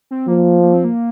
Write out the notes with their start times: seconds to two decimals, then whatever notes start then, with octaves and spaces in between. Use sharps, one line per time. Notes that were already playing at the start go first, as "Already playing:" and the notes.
0.11 C4
0.28 F3 A#3
0.63 A#3
0.73 C4
0.84 A#3